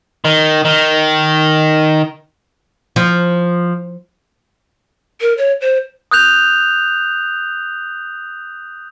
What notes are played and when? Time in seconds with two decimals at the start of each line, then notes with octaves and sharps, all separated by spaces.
0.25 D#3
0.65 D#3
2.96 F3
5.21 A#4
5.38 C#5
5.61 C5
6.11 D#6 F#6 G6 F7